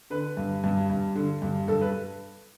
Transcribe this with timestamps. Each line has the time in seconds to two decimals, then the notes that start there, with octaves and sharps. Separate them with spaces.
0.10 D3 B4
0.37 G2
0.64 G2
0.90 G2
1.15 D3
1.42 G2
1.68 G2 A4
1.81 B4